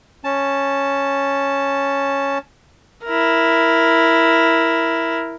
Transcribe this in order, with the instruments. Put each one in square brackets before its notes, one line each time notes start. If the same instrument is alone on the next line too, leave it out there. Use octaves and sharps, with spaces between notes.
[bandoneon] C#4 A5
[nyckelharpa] E4 A#4